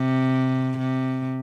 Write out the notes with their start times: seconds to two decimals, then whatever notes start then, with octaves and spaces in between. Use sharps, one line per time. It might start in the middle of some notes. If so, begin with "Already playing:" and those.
Already playing: C3
0.78 C3